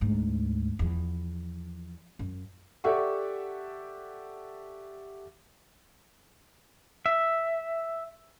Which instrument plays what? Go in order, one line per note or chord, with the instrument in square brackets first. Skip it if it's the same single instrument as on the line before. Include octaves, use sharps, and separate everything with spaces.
[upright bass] D2 G#2
E2 F3
F#2
[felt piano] G4 A4 D5 E5 F#5 C#6
[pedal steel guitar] E5